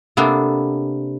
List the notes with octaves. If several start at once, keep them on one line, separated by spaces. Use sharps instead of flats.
C3 A#3 B3 D4 A4